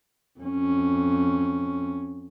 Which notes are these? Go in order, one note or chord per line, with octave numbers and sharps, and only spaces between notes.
F2 C#4